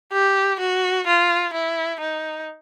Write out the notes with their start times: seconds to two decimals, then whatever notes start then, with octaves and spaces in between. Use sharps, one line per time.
0.12 G4
0.60 F#4
1.07 F4
1.53 E4
2.00 D#4